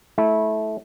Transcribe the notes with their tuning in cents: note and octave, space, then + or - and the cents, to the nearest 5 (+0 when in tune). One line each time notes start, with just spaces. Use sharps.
A3 -20 E4 -15